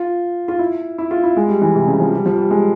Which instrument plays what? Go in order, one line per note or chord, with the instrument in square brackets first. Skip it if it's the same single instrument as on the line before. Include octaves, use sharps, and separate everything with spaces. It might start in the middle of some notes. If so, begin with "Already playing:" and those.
Already playing: [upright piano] F4
F4
E4
E4
F4
E4
G#3
G3
E3
C3
C#3
F3
G3
F3
G3
G#3